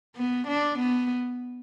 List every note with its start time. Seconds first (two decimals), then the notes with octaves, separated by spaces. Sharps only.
0.17 B3
0.48 D4
0.79 B3